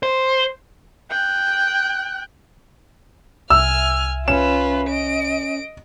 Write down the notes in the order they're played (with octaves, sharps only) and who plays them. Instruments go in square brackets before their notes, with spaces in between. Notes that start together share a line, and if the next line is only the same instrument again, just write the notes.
[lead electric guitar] C5
[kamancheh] G5 F#6
[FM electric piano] C2 E5 [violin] G#5 F6 [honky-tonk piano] E6
[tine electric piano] C#4 [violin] F4 B4 [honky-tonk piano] E7
[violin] D#5 D7